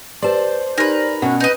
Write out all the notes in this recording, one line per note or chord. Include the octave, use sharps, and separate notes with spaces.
G4 B4 C5 D5 A5
D#4 G4 A#4 B4
B2 C#4 F#4 F#5
D#4 B4 D#5